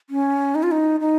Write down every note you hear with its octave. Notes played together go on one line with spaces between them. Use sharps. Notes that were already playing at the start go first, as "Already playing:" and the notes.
C#4
D#4
F4
D#4
D#4